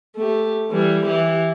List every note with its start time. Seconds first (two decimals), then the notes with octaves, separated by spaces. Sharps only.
0.16 A3 G4
0.71 E3 G3
1.06 E3 G4